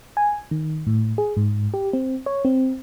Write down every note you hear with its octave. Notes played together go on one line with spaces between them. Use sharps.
G#5
D#3
A2
G#4
G#2
G4
C4
C#5
C4